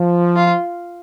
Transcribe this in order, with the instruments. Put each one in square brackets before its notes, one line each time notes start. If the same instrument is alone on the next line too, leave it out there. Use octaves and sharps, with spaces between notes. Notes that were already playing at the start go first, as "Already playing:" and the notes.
Already playing: [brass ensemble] F3
[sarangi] F4